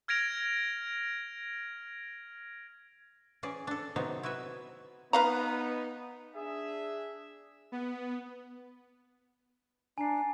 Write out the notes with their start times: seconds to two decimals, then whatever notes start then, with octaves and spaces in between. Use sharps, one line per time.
0.08 F6 G#6 A#6 D7 F7
3.43 E3 C#4 G#4 D5
3.67 D4 A4
3.96 C3 D#3 F#3 B3 D#4
4.23 E4 F#4 B4 E5
5.13 B3 D#4 B4 F5 A#5
6.35 D4 G#4 E5
7.72 B3
9.98 D4 G#5 A#5 C7